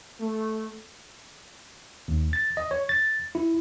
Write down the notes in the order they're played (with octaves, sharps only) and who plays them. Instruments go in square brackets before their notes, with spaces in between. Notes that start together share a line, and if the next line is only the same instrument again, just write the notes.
[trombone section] A3
[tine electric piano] D#2
A6
D#5
C#5
A6
E4